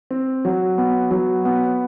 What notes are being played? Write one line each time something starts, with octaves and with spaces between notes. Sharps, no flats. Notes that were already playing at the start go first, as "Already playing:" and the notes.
C4
F#3
B3
F#3
B3